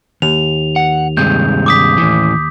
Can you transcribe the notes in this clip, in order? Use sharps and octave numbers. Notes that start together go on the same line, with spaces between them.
D#2 F7
F#5
G2 C3 G#3 G6
D6 D#6 B6
A2 E3